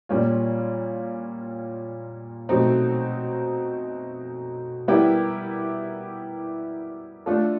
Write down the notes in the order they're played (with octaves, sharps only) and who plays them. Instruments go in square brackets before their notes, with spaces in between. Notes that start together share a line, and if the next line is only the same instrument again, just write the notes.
[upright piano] A#2 G3 A#3 C#4 F4
B2 F#3 A3 C4 D#4
G3 B3 E4 G4 A#4
A3 D4 F4 A4